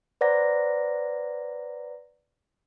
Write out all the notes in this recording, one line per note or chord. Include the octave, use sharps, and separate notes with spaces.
B4 C5 D5 F#5 A#5 A#6